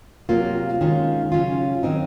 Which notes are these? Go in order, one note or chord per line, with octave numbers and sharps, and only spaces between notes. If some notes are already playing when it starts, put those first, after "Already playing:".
C3 F#3 A#3 F4
D#3 G#3 C#4 F4
C#3 F#3 C#4 F4
D#3 F#3 C4 D#4